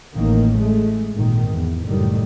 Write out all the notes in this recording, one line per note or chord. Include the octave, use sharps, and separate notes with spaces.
A1 D#3 A#3
G#3 A3
G#1 A#2 D#3
E2
F#1 A2 D#3 G3